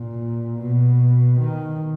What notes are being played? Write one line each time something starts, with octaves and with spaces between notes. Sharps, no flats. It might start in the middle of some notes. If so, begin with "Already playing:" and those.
Already playing: A#2
B2
D#3